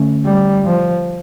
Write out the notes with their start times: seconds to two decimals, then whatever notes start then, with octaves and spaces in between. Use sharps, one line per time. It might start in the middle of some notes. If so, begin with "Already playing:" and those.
Already playing: D3 A3 C#4
0.25 G3
0.64 F3